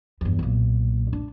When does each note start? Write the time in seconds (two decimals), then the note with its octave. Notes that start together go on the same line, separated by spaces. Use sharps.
0.21 E2 G2
0.39 B1 A#2
1.13 D4